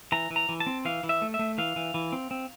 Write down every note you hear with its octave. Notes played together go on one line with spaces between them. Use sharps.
E3 A#5
E3
A#5
E3
A5
C4
E3 F5
E3
E5
A3
E5
A3
E3 F5
E3
E3
C4
C4